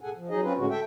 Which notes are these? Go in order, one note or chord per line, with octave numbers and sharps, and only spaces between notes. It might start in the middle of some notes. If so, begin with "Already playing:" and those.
A2 C3 G#4 A4 F#5 G#5
F3
F#3 D#4 G#4 D#5
C4 C#4 F4 B4
A2 D3 G#3 C#4 F#4
A4 E5 G5